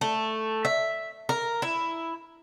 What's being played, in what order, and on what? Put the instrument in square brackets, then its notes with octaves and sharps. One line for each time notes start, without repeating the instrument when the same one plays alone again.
[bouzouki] A3
E5
A#4
E4